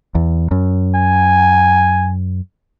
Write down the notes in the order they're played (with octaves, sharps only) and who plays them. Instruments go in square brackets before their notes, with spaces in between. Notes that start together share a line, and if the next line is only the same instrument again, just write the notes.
[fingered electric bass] E2
F#2
[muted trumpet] G#5